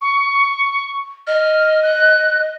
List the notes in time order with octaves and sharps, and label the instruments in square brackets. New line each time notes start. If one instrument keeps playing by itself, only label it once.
[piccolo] C#6
[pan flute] D#5 [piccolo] F6
[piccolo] F#6